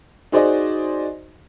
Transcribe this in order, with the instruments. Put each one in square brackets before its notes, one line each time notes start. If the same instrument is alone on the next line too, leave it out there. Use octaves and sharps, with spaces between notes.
[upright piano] D#4 F#4 G#4 C5 D5 D#5